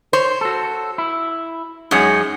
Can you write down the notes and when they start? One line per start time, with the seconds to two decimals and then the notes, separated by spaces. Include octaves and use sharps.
0.13 C5 C#5
0.41 F#4 A4
0.98 E4
1.91 F#2 G#3 D#4 C#5 G#5